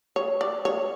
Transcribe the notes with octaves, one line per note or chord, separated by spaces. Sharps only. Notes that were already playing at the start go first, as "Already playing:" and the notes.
C#5
D5
C#5